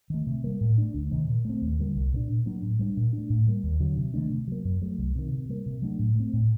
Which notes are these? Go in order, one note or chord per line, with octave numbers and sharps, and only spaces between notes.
D#3 A3
C3
G3 A#3
A2
A3 D4
D2
C3 D#3
A#2
A3 C4
D#2
D3 G3 A#3
C2
A#2 A3 D4
A#2
F#3 A#3 D4
A2
G3 A#3 D4
A#2
D4
A3
A2
G3 A#3
D#2
D3 F#3
C3
D#3 A3 D4
C3
F#3 A#3
F#2
F#3 A3
C2
C3 D#3
C3
G3 A#3
C3
F#3 A3 D4
A2
A3 C4
A2